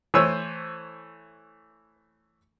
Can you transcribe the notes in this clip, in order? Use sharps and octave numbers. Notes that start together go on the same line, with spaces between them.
E3 A3 C5 C#5 E6